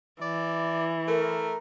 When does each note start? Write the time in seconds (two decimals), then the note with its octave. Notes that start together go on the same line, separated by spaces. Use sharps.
0.22 E3 D5
1.08 A3 A#4